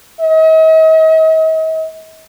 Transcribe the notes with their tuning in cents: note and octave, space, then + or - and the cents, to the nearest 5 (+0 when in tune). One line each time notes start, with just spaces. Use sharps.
D#5 +45